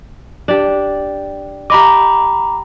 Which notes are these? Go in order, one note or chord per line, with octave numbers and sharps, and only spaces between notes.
D4 G4
G4 D#5 A#5 B5 D6